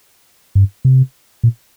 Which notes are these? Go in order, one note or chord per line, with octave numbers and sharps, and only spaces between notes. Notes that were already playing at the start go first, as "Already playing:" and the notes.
G2
C3
A#2